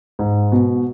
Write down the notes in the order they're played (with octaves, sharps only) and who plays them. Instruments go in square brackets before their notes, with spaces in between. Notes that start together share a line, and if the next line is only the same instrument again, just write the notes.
[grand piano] G#2
B2